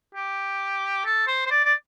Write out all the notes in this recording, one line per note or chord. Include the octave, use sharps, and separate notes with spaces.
G4
A4
C5
C5
D5
D5